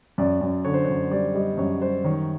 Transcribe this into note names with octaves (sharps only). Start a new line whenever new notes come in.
F#2 D5
F#2
D3 C#5
C5
F#2 C#5
G3 D5
G3 D#5
F#2 C#5
G3 C5
D#3 C#5